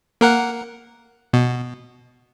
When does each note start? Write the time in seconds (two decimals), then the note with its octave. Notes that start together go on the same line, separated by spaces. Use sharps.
0.21 A#3 A#4 F#5
1.33 B2